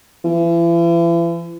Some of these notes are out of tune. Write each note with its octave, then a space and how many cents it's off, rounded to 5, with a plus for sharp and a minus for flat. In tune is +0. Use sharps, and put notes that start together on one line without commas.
E3 +40